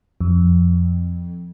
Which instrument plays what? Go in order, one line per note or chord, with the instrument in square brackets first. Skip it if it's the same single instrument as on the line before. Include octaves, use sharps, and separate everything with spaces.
[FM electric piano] F2